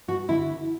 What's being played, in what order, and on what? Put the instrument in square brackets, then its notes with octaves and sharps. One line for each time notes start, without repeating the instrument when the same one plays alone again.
[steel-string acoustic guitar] G2 F#4
D3 E4